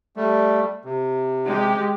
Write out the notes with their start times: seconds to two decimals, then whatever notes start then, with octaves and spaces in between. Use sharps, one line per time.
0.16 G3 A3
0.85 C3
1.45 G#3 G4